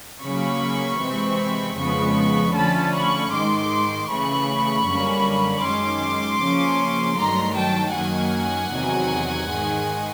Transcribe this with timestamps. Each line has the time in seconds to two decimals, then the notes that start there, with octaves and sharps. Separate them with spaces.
0.23 C#3 F#3 A#3 C#4 B5 C#6
1.01 C3 E3 G#3 C4
1.77 F2 C#3 F3 G#3 B3 B5 C#6
2.54 D3 F3 A3 C#4 A5 B5
2.94 B5 C#6
3.31 G#2 D#3 G#3 C6 D6
4.08 C#3 E3 A3 B5 C#6
4.86 F#2 D3 G3 A#3 C#4
5.63 F#2 D#3 G#3 C#4 C6 D6
6.39 C#3 F3 A#3 C#4
7.16 G2 D#3 F#3 A3 A#5 C6
7.55 G5 A5
7.93 F#2 D#3 F#3 A#3 F#5 G#5
8.71 E2 C3 D#3 F#3
9.48 G#2 D#3 G#3